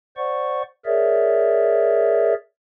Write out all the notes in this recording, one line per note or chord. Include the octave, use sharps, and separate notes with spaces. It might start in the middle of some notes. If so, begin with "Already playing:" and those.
C5 D5 F#5 C#6
G#4 A#4 C#5 D5 E5